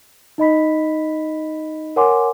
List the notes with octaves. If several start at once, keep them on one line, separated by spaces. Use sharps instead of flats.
D#4 D#5 B5 B6
A#4 C#5 F#5 G#5 C6 D6